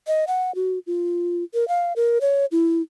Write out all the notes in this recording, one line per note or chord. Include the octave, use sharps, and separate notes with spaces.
D#5
F#5
F#4
F4
A#4
F5
A#4
C#5
E4